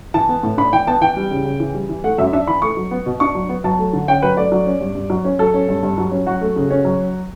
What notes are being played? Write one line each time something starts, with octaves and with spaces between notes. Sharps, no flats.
E3 A5
B3
A2
D4 B5
E3 G5
B3 A5
E3 G5
G3
C#3
C#3
E3
G3
E3
A3 F#5
F#2 E5
D4 E5
E3 B5
A3 C#6
F#3
B3
B2
D4 C#6
F#3
B3
F#3 A5
A3
D3
C#4 G5
F#3 B4
A3 D5
F#3
C#4
G2
G2
F#3
C#4
F#3 A4
C#4
G2
G2
F#3
C#4
F#3 F#4
A3
C#3
C#4
F#3